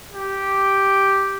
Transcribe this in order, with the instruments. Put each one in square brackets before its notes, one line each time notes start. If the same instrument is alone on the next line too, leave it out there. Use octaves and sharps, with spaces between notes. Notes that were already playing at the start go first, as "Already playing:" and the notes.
[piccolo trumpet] G4